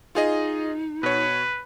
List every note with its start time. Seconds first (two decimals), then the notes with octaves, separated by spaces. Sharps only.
0.15 D#4 F4 G#4 D#5
1.03 B2 B4 C#5